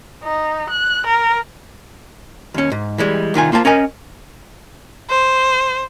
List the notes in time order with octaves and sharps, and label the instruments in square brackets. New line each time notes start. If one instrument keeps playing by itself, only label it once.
[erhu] D#4
F#6
A#4
[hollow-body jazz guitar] D#2 C#4
G#2
E3 G3 G#3
C2 D#3 F4 G#5
A#3 F4 C5 G#5 A5
C#4 A#4 D#5 G#5
[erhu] C5